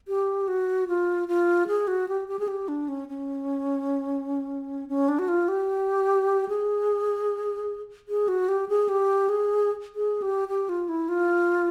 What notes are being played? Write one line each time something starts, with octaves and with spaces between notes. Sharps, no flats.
G4
F#4
F4
F4
G#4
F#4
G4
G4
G#4
G4
D4
C#4
C#4
C#4
D4
F#4
F4
G4
G#4
G#4
F#4
G4
G#4
G4
G#4
G#4
G4
G4
F4
E4
F4